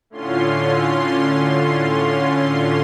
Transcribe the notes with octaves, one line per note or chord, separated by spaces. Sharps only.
A2 D3 C#4 F4 C6